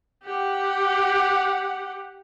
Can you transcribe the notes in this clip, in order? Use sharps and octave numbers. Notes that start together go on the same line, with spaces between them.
G4 F#5